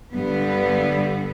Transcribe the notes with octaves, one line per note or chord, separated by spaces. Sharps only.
G2 D3 G3 B3